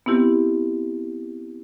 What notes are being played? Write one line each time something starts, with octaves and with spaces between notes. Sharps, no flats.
B3 C4 E4 G4